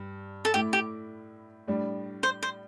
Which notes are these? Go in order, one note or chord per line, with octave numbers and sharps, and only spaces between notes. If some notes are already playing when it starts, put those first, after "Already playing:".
Already playing: G2
A4
A2 A3 E4 G4
G4
A2 G3 D4
C5
C5